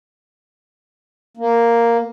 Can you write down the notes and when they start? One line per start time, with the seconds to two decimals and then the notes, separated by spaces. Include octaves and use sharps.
1.37 A#3